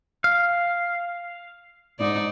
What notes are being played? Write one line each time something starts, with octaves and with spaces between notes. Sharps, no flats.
F5
G#2 D#4 D5